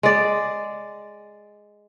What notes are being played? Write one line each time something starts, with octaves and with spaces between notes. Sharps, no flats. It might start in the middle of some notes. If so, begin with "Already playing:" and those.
G#3 D5